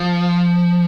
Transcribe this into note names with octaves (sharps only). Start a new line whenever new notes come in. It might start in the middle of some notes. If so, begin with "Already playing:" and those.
Already playing: F3